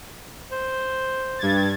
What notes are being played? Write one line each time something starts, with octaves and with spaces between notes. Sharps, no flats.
C5
G2 G#6 A6